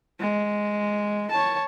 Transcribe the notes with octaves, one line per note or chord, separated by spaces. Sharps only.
G#3
C#5 A5